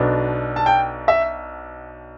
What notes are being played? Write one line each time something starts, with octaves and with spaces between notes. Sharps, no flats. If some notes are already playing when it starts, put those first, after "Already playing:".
Already playing: B1 B2 B3 D4
A5
G5
E5